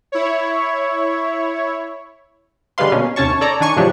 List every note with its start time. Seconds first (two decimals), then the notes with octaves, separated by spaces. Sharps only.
0.12 E4 C#5
2.78 D3 G3 G#3 B4 F5 C6
2.92 B2 A#3 C#4
3.16 D#2 C3 C#4 C#5 A5 C#6
3.41 A4 C#5 D5 A#5
3.61 D#3 D4 G#5 C#6
3.77 A2 C#3 F3 F#3 D4 G4